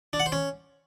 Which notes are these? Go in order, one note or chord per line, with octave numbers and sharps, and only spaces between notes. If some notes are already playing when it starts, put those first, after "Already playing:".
D4
F#5
C5
C#4